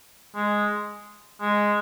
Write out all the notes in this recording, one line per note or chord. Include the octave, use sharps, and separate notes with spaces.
G#3
G#3